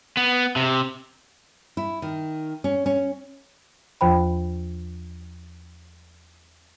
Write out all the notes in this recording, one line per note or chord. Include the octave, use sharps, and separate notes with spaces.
B3
C3
E4
D#3
C#4
C#4
E2 F3 F4 C5 G5 B5